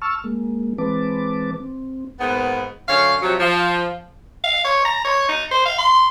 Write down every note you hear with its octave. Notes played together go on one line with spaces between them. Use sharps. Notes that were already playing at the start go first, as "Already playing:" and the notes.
A5 C#6 E6 F6
G#3 A#3
E3 G#3 C4 B4 A5 D6
C4
G#2 A#3 B3
F#2 D3 C#4 C#5 F5
C3 F3 F#3
F3
F5
C#5
A#5
C#5
D#4
C5
F5
C6